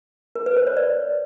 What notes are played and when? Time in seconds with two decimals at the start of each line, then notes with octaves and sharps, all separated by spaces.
0.35 A#4
0.46 B4
0.57 C5
0.67 C#5
0.77 D5